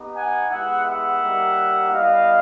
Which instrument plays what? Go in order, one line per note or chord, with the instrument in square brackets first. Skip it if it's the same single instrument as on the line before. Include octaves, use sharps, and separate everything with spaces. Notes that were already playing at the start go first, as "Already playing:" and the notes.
Already playing: [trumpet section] B3 D#4 G4
F#5 G#5
G#3 B3 E4 G4 E5 F#5
E5 F#5
G3 A#3 D#4 G4
G3 B3 E4 D#5 F5